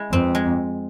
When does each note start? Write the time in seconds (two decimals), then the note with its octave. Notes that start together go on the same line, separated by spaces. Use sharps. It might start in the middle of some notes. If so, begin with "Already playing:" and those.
Already playing: G#3 E4
0.12 F2 C4
0.35 G#3